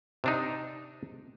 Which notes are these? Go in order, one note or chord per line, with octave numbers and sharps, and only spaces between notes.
C3 D4 D#4